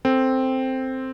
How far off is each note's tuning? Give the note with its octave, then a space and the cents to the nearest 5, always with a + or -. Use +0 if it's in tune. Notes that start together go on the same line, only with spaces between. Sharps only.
C4 +0 A4 +0